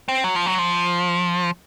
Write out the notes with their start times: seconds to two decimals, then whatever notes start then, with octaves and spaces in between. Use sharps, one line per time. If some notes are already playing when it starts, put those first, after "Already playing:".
0.09 C4
0.24 F#3
0.36 F3
0.46 F#3
0.58 F3